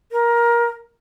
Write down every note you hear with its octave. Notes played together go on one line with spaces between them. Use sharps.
A#4